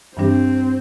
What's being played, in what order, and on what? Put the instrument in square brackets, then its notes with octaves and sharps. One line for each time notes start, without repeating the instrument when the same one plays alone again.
[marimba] G2 E3 G3 D4 G4 [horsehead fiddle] C4